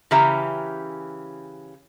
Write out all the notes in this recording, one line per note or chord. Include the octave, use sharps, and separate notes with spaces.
C#3 E3 C#4 G4 E5 A#5